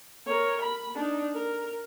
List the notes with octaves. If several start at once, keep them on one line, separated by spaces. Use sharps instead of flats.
A#4 C#5
B5
D4 D#4
A#4